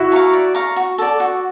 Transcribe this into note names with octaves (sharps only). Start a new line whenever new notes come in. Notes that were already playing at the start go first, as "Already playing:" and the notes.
Already playing: E4 F#4
F5 A#5 C#6
D5
F5 A#5 C#6
F#4
A4 D5
F#4